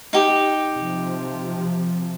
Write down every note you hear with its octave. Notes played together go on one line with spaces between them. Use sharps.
D#4 G4
C3 F3